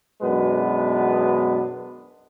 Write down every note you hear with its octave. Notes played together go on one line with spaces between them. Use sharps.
F#2 B2 G#3 B3 D4 B4